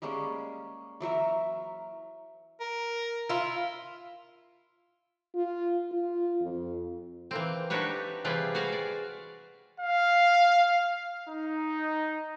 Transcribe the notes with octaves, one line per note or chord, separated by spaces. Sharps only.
G3 G#3 A#3 C#4
E3 F#3 A#4 E5
A#4
E4 F4
F4
F4
F2
E3 A#3 C4
D4 D#4 F#4 G4 B4 C#5
C3 E3 G3 F4 G#4 B4
F#4 G#4 B4 F5
D5
F5
D#4